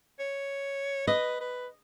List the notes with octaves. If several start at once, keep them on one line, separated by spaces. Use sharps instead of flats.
C#5
B4 D#5
B4